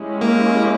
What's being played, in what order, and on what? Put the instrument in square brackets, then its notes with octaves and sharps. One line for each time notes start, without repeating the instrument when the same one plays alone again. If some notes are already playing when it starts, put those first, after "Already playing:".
Already playing: [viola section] G#3 C#4 E4 G4
[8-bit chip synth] A#3